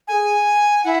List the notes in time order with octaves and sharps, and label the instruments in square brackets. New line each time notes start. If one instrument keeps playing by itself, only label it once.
[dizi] A4 [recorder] G#5
[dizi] G#4
[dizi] E4 [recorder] F#5